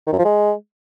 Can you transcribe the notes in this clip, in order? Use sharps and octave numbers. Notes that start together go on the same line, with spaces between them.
D#3
F#2
F3
G#3